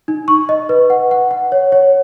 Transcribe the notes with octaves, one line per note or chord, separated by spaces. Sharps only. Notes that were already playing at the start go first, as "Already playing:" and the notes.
D#4
C#6
D#5
B4
F#5
F#5
F#5
C#5
C#5